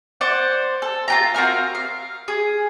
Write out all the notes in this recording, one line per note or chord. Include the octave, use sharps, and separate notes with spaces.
C5 D5 F#5
A4
F4 G4 A#5
C4 F#4 A#4 F5
F5
G#4